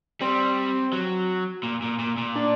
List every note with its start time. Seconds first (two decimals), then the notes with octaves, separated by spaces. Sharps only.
0.21 G3 C4
0.93 F#3
1.63 A#2
1.82 A#2
1.99 A#2
2.18 A#2
2.36 D4